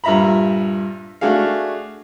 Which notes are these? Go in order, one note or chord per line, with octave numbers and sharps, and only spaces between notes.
G2 A#2 E5 A#5 B5
A3 D4 F#4 G#4 F5